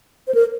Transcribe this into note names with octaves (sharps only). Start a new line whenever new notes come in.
C5
A#4